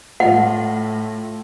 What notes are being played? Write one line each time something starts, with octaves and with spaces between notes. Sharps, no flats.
A2 F4 F#5